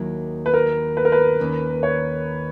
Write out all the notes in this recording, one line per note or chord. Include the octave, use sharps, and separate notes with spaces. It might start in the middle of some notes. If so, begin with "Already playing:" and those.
Already playing: D#2 D#3 F#3 A#3 E4
B4
A#4
B4
A#4
B4
D#2 D#3 A#3 C#4
C#5